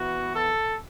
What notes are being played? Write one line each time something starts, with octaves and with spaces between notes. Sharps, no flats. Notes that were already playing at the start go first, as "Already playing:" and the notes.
Already playing: E3 B3 F#4
A4